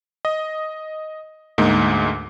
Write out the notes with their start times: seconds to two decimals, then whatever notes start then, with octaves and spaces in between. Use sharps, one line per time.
0.25 D#5
1.58 D2 G#2 A#3 D#4